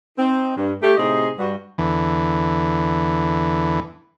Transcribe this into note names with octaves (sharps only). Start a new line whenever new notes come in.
C4 D#4
G2
A3 G4
A2 C3 D#4 G#4 C5 D#5
G2 F#4
E2 D3 E3